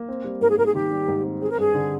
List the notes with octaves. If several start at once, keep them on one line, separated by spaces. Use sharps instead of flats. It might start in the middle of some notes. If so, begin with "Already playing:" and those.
Already playing: A#3
C4
G3
G#2 A#4
G#4
G#2 A#4
G#4
D#3 G4
G3
G#2
C4
C4 G#4
A#4
G2 G#4
D3